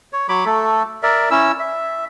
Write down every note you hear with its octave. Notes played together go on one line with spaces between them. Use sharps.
C#5
F#3 C#5 B5 D6
A3 A4
A#4 D5 E5
C#4 E4 E6
E5